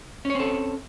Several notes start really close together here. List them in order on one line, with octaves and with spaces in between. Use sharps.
C#4 C#5 C4 A4